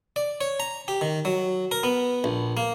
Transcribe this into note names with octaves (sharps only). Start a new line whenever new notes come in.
D5
C#5
A#5
G4
D#3
F#3
A#4
B3
A#1
A#3